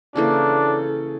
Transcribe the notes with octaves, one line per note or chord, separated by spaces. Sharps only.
C#3 E3 A#3 D4 A4